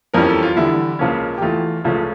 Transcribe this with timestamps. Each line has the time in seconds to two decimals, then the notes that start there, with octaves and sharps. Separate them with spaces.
0.14 F2 E3 G3 C#4 A#4
0.29 A4
0.43 F4
0.56 E2 D3 G3 E4
0.99 C#2 C#3 F3 A#3 C#4
1.38 G4
1.42 E2 E3 A3 F4
1.85 C#2 C#3 F3 A3 C#4